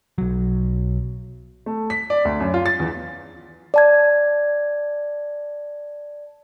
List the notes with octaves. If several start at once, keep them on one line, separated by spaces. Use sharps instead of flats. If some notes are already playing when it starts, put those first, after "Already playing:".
B1 F#3
A3
B6
D5
D2
F#2
F4
A6
E2
D5 A5 G#6